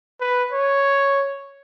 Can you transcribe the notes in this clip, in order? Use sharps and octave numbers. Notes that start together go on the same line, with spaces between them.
B4
C#5